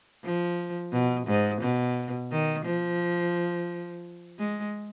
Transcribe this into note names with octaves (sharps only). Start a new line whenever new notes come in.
F3
B2
G#2
B2
D#3
F3
G#3